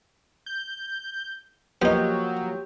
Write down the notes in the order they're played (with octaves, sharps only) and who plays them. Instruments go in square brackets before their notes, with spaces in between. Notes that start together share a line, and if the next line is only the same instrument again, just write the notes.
[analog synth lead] G6
[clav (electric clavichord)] F3 A#3 [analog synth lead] F#3 [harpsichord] B3 D#4 [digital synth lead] G4